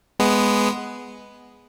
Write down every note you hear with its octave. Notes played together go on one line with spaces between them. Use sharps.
G#3 B3